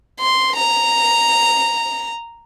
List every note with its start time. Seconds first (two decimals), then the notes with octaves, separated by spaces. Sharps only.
0.20 C6
0.56 A#5